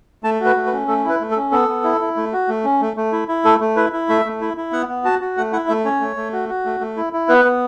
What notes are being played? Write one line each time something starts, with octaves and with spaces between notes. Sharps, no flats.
A3 A5
F#4
B4
A3
B4
C#4
A3 A4
E4 B4
A3
A4
C#4
B3 A4
B3
E4
E4
A3
F#4
A3
C#4
A3
A3
E4
E4
A3 A4
A3
E4 B4
E4
A3 E5
A3
E4
E4
B3 F#5
B3
F#4 A5
F#4
A3 F#5
E4 F#5
A3 E5
C#4 C#5
A3
A3
F#4
F#4
A3
A3
E4
E4
B3 B4
B3